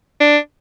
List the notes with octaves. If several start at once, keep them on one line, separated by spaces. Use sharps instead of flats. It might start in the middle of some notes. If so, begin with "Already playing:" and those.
D4